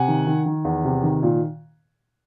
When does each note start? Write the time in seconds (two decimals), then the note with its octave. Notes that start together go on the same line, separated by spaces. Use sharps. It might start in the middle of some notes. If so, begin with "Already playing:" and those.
Already playing: C3 F#5 G#5
0.08 D#3
0.27 D#3
0.46 D#3
0.65 E2
0.85 C3
1.03 D#3
1.23 A#2